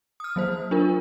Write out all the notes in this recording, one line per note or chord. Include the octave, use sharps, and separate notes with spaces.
D#6 F6
F#3 A#3 C5
D4 F4 A#4